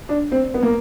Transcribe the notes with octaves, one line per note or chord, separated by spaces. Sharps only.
D4
C4
B3
A#3